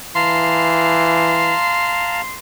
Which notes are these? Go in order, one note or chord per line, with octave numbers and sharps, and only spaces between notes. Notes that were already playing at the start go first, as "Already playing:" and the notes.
E3 F5 A5 A#5 C6